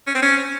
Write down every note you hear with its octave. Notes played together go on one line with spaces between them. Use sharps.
C#4
C4
C#4